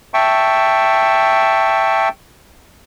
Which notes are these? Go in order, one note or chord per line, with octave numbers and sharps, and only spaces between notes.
E5 G5 A5 C#6